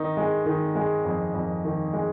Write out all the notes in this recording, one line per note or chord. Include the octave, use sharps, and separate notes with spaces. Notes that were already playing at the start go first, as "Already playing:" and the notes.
Already playing: D#3 D#4
G#3
D#3
G#3
F2
F2
D#3
G#3